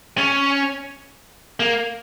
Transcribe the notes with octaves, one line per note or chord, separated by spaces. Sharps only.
C#4
A#3